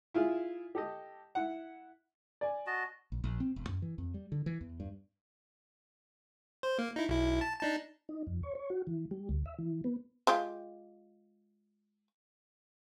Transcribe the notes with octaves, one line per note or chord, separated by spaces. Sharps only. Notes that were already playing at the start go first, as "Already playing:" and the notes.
E4 F4 G#4
G4 A4 D#5
E4 F#5
D5 G#5
F#4 D#5 A5
A#1
A#1
C4
E1
F#2
E3
F2
G3
D3
E3
E2
G2
C5
A#3
D#4 E4
B1 E4
A5
D4 D#4 A5
D#4
F2
C#5
C#5
F#4
E3
G3
D2
E5
E3
B3
G#3 F4 G4